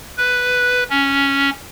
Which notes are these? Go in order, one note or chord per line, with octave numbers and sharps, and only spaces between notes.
B4
C#4